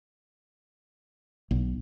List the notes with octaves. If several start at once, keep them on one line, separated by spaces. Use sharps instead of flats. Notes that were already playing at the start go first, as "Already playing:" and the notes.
B1